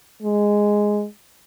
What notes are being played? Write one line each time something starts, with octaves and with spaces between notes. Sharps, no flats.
G#3